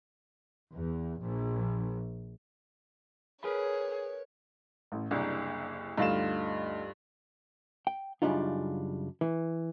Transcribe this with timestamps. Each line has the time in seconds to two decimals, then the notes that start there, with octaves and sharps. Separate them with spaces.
0.72 E2
1.21 A#1
3.43 G#4 A#4 B4 C#5 B5
4.92 A1
5.11 F#1 C2 D4
5.98 D2 G2 D#4 F4 D#5 E7
7.87 G5
8.22 F#2 C#3 G3 D4 D#4 F4
9.21 E3